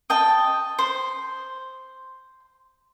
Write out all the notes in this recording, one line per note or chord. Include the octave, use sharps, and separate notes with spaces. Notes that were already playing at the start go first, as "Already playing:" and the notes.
D#5 G5 A5
C5